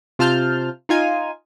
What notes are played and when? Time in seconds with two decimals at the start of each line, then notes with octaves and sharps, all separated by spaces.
0.19 C3 F4 A5 F6 G6
0.89 D#4 F4 G#5